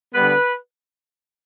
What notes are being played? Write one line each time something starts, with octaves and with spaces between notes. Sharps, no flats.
D3 G3 B3 B4